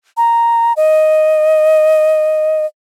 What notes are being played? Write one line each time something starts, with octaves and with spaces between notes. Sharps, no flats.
A#5
D#5